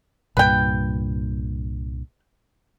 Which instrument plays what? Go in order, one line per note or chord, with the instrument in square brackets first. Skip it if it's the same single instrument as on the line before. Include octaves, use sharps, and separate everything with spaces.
[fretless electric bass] C2 G2 A#2 [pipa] B4 G5